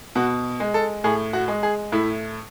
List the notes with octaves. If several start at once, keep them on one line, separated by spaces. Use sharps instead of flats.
B2 F#4
G#3
A4
A2 G#4
F#4
G#3
G#4
A2 E4